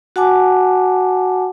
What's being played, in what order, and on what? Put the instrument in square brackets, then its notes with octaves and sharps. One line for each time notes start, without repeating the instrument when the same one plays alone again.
[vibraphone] F#4 F#5 G#5 A5 D6